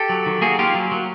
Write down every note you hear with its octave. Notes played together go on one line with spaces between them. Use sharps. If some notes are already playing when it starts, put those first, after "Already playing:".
Already playing: G4 A4
F#3
D#3
A#3 F#4 G#4
A#3 F4 G4
F#3
F#3